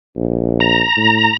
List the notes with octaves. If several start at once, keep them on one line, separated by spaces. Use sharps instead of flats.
A#1
A#5
A2